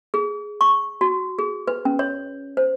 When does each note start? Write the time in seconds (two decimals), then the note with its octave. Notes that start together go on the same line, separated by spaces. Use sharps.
0.14 G#4
0.61 C#6
1.01 F#4
1.39 G#4
1.68 B4
1.85 C#4
1.99 C#5
2.57 C5